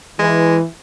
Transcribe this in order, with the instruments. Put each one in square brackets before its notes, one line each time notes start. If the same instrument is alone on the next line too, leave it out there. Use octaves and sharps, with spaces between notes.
[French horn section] E3 [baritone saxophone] G#3